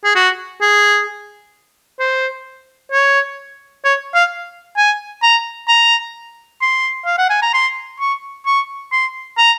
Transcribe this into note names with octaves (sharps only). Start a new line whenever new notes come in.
G#4
F#4
G#4
C5
C#5
C#5
F5
G#5
A#5
A#5
C6
F5
F#5
G#5
A#5
C6
C#6
C#6
C6
A#5